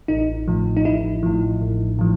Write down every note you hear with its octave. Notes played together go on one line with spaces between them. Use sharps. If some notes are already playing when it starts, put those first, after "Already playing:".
A1 D#4
A2 F3
D#4
A1 E4
A2 F3
A1
A2 F3